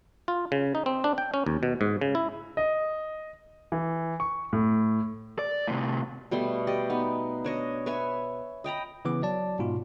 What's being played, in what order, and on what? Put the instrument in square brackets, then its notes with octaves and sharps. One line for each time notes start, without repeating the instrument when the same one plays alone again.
[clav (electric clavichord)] F4
C#3
D#4
C4
D4
G5
C#4
D#2
B2
G#2
C#3
E4
[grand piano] D#5
E3
C#6
A2
[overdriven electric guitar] D5
A2 C3
[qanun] B2 G3 A3 C6
G4 D5 D#5
B3 D#4
D4 C#5 D#5
B4 C#5 E5 G#5
D#5 G5 A#5 B5
[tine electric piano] C#3 E3 B3 D6
F#3 D5 A5
G#2 B2 F4